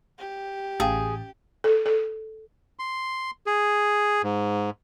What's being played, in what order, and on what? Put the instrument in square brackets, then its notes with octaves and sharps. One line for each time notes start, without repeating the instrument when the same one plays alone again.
[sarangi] G4
[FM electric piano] A1 A5 [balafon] C#4 F5 G5 [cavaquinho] G#4
[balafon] A4
A4
[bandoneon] C6
G#4
G#2